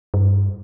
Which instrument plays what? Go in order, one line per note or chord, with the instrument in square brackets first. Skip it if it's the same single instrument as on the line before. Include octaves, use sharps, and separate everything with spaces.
[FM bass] G2